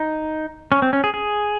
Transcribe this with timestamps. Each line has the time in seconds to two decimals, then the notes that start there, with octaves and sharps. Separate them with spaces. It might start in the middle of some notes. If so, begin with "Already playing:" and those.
Already playing: D#4
0.72 C#4
0.82 C4
0.93 C#4
1.04 G#4
1.14 G#4